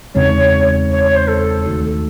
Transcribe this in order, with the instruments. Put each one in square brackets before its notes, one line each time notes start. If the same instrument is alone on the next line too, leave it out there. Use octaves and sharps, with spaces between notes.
[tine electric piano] E2 C#3 G#3 C4 D#4 [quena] C#5
[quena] C#5
C#5
C5
A4
[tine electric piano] D#2 D#3 A3 D#4 F#4